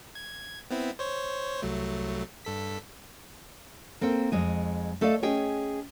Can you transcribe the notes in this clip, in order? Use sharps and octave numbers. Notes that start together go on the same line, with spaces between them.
G#6
B3 C4 E4
C5 C#5
C2 F#3 A3
G2 A4 B6
A#3 C4 A4 G5
F2 G#3 D#5
A3 A4 D5 D#5 F5
C#4 G#4 D#5 G5